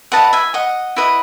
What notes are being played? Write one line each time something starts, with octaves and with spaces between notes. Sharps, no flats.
E4 B4 D#5 F#5 A5
E5 G#5
D#5 F#5
E4 B4 D#5